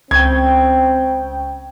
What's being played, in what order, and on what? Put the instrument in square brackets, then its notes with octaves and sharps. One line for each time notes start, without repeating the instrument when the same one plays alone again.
[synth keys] C#2 G5 [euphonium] C4 [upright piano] G#6